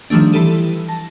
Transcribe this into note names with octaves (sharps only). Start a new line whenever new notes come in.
D#3 F3 G3 A3 D4
E3 E4 G4 A4 D#7
A5 A#6